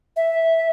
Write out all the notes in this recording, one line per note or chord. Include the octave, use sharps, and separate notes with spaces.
E5